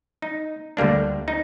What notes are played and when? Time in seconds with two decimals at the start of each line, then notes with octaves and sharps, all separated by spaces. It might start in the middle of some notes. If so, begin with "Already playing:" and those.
0.22 D#4
0.77 D2 D3 G3 A#3 D4
1.28 D#4